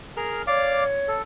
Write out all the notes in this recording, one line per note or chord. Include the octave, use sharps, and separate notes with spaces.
G#4 A#4 F6
C#5 D5 F5 D6
A4